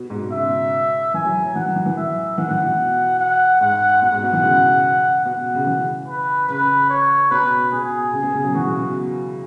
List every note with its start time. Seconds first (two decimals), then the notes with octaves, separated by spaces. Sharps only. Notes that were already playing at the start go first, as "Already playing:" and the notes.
Already playing: B2
0.10 G#2
0.21 B2
0.32 C#3 E5
1.14 E3 G#5
1.25 F#3
1.45 F#3
1.55 E3 F#5
1.66 F#3
1.76 E3
1.86 E3
1.96 E5
2.38 E3 F#5
2.51 E3
2.65 B2
3.20 F#5
3.61 G#2 F#5
4.02 B2 F#5
4.12 G#2
4.23 B2
4.33 E3
4.43 C#3
5.25 B2 F#5
5.55 C#3
5.66 E3
6.08 B4
6.49 C#3 B4
6.90 C#5
7.31 B2 B4
7.72 B2 G#4
8.13 C#3
8.23 B2
8.34 C#3
8.44 F#3
8.54 E3 F#4
8.65 C#3
8.75 B2